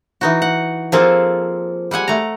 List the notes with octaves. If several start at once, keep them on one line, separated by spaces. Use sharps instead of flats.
E3 D#4 F#4
F#5
F3 A#3 C4 F4 G#4 A4
G3 G#3 F#5 G#5
A3 A#5